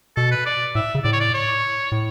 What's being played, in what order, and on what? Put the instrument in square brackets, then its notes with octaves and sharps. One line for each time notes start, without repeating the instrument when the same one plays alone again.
[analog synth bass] B2 [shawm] A4
[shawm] B4
D5
[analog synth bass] A2 [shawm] E5
[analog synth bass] C#3
[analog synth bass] A2 [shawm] D5
[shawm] C#5
D5
C#5
[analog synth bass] A2